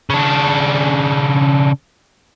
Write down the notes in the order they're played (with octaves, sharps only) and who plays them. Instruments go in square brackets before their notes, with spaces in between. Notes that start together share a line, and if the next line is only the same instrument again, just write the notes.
[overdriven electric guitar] C#3 D4